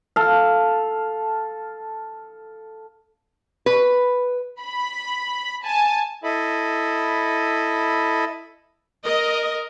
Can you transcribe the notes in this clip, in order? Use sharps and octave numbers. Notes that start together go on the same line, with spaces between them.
A4 F5
B4
B5
G#5 A5
E4 A4 D#5 B5
A#4 D#5